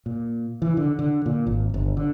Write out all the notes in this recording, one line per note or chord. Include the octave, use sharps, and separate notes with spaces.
A#2
E3
D3
D3
A#2
G#1
G1
D3